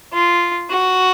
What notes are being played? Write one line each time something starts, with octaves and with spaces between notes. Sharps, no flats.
F4
F#4